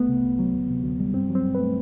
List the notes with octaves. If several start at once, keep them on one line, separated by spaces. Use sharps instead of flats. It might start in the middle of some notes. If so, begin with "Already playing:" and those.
Already playing: C2 A3 B3
C3
C2
F#3
D2
C3
D2
G3
G2 C4
F#3 C4
G2
B4
A3